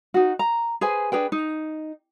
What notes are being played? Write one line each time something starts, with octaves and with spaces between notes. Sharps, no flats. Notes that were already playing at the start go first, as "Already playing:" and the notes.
D#4 F#4
A#5
G#4 B4 C5 G#5
D4 G#4 B4 G5
D#4